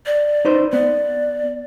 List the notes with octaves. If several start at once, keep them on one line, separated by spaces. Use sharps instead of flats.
D5
D#4 B4 C5
B3 D5